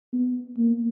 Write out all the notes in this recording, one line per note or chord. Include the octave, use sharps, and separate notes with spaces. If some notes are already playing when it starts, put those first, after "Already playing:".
B3
A#3